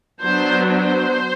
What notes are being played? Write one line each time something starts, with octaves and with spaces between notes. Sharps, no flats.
F#3 B3 D4 C5
C5